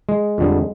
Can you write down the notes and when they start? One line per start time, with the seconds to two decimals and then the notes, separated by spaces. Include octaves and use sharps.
0.09 G#3
0.38 F2 D3 G3